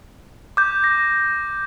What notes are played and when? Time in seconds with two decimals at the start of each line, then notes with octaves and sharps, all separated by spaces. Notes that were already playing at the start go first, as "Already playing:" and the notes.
0.57 D6 G6
0.84 A#6